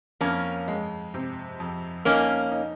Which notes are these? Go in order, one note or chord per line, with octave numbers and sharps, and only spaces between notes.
F2 A#3 C#4
G#3
C3
F2
A#3 C#4 D#4
D#4